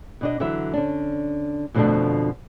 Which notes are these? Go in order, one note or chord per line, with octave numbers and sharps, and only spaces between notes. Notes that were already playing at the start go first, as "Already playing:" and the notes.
B2 D4 D#5
D3 E3 F#3 E5
D3 C#4 D4
F2 B2 D3 F3 A3 D4